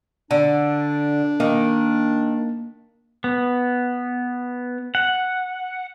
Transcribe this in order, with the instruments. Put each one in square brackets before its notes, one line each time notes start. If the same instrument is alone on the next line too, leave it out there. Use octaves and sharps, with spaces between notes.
[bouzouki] D3 [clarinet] D4
[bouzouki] D#3 [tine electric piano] A#3
[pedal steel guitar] B3
F#5